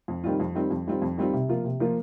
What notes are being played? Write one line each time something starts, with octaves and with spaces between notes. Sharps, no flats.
F2
D#3 G3 C4 F4
F2
D#3 G3 C4 F4
F2
D#3 G3 C4 F4
F2
D#3 G3 C4 F4
C3
F3 A#3 F4
C3
F3 A#3 F4